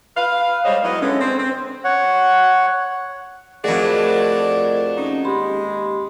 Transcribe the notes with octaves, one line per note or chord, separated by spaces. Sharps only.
B4 F5
G3 G#3 C5 C#5 D#5
F#3 B3 E4 D#5
D3 G#3 B3 C#4
C4
C4 C5
C#5 F#5
F2 A3 F#4 G#4 A#4 D5 D#5 F#5
C#4 D#4
D#2 G#3 G4 B5 C6